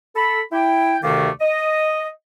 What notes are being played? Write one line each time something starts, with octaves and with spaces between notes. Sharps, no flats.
A4 B5
E4 G5
D2 C3 D#3 A3 D5 F5
D#5